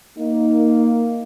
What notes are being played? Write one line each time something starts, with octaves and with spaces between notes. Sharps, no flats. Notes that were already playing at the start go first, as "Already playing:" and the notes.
A#3 D#4